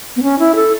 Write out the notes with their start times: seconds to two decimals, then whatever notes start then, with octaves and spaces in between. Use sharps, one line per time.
0.16 B3
0.23 C#4
0.39 E4
0.55 A4